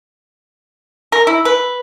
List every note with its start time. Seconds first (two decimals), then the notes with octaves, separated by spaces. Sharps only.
1.12 A#4
1.27 E4
1.45 B4